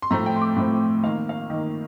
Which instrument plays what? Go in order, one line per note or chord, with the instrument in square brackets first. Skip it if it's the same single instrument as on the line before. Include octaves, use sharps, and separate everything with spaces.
[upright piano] C6
A2 F3 A3 C4 A#5
G5
C6
D6
A2 F3 A3 C4
D#3 A#3 F5
F5
D#3 A#3